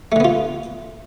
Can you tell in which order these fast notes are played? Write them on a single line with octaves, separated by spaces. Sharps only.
A3 D3 B3 F4